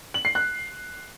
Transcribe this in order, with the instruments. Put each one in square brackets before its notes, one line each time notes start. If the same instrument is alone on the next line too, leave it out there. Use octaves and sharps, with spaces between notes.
[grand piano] F#7
C7
F#6